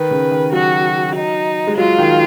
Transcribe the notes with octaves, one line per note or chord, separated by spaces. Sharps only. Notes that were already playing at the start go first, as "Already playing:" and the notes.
Already playing: D#3 B4
C#3
D#3
F#3 F#4
D#4
G#3
F#3 F4
D#3